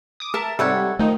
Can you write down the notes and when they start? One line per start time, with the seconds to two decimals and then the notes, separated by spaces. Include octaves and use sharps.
0.20 D6 D#6
0.34 A#4 E5 A5 A6
0.59 G#2 C3 G3 A4 C#5 F#5
0.99 D#3 F3 A3 D#4